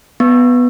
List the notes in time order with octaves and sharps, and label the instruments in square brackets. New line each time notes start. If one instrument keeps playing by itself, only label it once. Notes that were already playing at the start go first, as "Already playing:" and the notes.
[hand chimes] B3